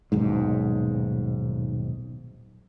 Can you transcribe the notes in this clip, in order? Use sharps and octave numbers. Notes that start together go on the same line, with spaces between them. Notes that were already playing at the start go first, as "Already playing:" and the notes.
D#1 B1 G#2